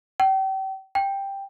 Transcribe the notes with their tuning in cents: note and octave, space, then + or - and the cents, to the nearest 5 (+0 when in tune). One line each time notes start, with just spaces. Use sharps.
G5 -35
G5 +5